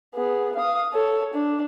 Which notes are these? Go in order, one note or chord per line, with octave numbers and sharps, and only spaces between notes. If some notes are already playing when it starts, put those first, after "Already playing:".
B3 G#4
F5 D#6
A4 C#5
D4